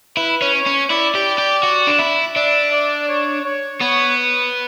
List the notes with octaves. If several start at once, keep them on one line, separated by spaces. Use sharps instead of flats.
E4 B4
C#4
C#5
C#4
E4 D5
G4
G4
F#4
D4
E4
D4 E5
D5
C#5
C#5
B3 C#5